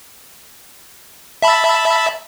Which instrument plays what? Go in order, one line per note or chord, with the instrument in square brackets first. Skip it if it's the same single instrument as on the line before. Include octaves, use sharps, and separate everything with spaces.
[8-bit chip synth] E5 A5 B5